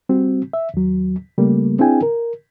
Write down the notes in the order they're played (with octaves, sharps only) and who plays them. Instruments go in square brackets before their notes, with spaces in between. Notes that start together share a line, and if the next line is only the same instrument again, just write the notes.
[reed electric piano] G3 C4 F#4
E5
D#2 F#3
C#3 G3 A3 A#3
C4 D4 E4 G#4 G5 G#5
A#4